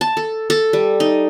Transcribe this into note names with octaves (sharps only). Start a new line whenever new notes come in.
A5
A4
A4
G3
D#4